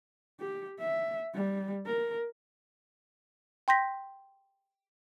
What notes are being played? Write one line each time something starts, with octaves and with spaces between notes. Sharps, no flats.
G4
E5
G3
A#4
G5 C6 G6 A#6 B6